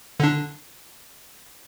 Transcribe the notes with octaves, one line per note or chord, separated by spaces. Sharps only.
D3 D4